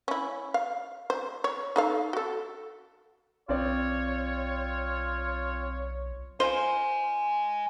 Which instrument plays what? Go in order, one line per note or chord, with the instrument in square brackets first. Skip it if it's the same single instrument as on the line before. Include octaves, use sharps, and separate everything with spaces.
[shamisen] C#4 E4
F5
C5
C#5
D#4 A4 F5
F#4 A4
[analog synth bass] B1 [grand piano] C4 D5 [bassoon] F4 [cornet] C#5
[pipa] F4 C5 [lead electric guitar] D#5 G#5